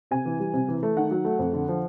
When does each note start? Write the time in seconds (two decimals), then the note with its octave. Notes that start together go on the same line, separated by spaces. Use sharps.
0.11 C3 G#5
0.25 E3
0.40 G3
0.53 C3
0.68 E3
0.83 A3
0.96 D#3 F#5
1.11 F#3
1.25 A3
1.39 F2
1.53 D3
1.69 F3